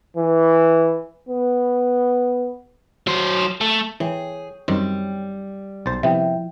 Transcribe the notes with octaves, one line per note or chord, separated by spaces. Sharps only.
E3
B3
F#3 C5
A3
E3 G#4 C#5 G5
F#2 D#3 G3 C4
B1 C5 C6 A6
C3 F3 B3 E4 E5 G5